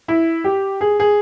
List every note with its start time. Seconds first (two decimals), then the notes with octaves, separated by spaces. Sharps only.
0.08 E4
0.44 G4
0.81 G#4
1.00 G#4